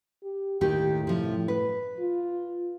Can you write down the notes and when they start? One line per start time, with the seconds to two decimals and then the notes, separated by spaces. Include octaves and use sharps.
0.23 G4
0.61 D#2 A2 D#3 G4
1.07 C3 F3
1.48 B4
2.00 F4